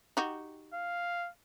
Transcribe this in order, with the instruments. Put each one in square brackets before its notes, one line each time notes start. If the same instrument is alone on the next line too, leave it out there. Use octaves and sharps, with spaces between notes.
[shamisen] D#4 F#4 G4
[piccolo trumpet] F5